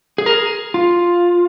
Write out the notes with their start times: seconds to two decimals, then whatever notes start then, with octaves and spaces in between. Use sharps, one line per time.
0.18 G#4
0.26 A#4
0.34 G#4
0.74 F4